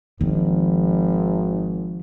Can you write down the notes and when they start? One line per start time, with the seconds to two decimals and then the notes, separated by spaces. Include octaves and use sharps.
0.21 G#1 D#3 F3